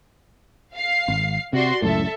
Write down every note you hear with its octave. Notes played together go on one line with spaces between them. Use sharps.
F5 C7
G#1
C3 F#4 D5 C6
C#2 F#2 A2 A4 E5